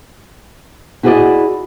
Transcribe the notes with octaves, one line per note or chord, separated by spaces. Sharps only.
E4 F#4 G#4 A4 D5 D#5